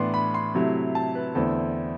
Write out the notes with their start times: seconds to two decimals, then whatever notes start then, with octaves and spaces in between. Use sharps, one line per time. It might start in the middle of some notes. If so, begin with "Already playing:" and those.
Already playing: A2 E3 B3 D4 C6
0.14 B5
0.34 C6
0.55 C3 F#3 A3 E4
0.95 A5
1.15 B4
1.35 E2 D3 A3 C4 E4 A4